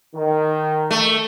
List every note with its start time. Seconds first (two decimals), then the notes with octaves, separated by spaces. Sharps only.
0.15 D#3
0.91 A3